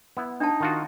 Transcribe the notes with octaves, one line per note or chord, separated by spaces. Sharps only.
B3 E4
D4 D#4 A5
D#3 F4 F#4